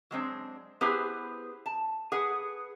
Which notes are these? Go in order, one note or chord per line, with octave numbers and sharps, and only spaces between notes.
F#3 G#3 C4 D4
B3 E4 G4 G#4 B4 C5
A5
G#4 B4 F#5